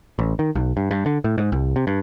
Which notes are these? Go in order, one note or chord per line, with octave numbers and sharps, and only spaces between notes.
A1
D#3
B1
G2
G2
D3
A2
G#2
C2
C3
G2